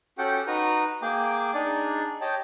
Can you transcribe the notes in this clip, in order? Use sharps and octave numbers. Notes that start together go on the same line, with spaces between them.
C#4 F#4 G4 A4 F#5 G5
D#4 F#4 B4 A#5
A#3 G#4 G5 D6
D4 D#4 G#4 D5
G4 C#5 D#5 G5 A5